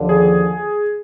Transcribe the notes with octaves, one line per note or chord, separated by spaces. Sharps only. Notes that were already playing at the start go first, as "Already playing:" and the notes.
Already playing: D#2 D3 F3
G#4